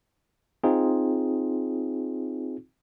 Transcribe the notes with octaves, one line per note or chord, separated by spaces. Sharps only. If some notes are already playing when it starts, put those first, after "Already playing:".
C4 D#4 F4 G#4